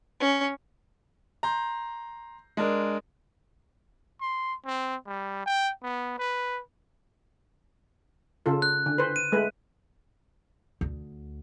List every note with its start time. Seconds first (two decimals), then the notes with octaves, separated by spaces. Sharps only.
0.20 C#4
1.43 A#5 C6 G6
2.57 G#3 D4 A#4
4.20 C6
4.66 C4
5.06 G3
5.46 G5
5.83 B3
6.18 B4
8.46 C#3 F4 A4
8.62 F#6
8.86 D3
8.98 B4 C5
9.16 D#7
9.32 G#3 A3 B4
10.81 D2